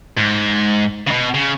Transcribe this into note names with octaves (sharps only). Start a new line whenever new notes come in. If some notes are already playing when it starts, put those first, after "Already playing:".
G#2
C#3
B2
C#3